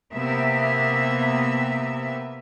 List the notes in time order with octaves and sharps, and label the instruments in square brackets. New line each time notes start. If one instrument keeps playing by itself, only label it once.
[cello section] C3 A#3 B3 E5